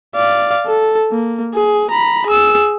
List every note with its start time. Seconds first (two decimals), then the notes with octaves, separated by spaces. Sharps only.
0.15 D5 F5
0.66 A4
1.12 A#3
1.53 G#4
1.90 A#5 B5
2.26 G#4 E6